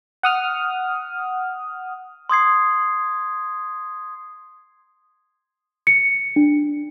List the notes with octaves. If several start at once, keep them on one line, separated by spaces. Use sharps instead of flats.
F#5 D#6 F6
C6 D#6 G#6 C7
C#7
D4